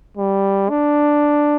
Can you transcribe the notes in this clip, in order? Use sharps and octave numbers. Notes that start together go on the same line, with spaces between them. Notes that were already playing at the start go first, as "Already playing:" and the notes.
G3
D4